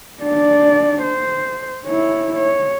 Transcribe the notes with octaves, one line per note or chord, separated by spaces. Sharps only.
D4 D5
C5
E4 C#5
C#5